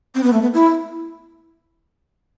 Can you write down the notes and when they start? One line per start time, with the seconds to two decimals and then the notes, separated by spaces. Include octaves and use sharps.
0.15 C4
0.23 B3
0.33 A3
0.42 B3
0.54 E4